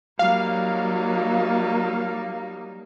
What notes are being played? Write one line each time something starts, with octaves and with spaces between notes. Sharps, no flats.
F#3 G3 A#3 D#4 F5